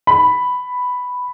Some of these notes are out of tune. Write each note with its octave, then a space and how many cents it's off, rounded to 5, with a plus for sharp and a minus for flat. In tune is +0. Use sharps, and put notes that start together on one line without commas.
B5 +5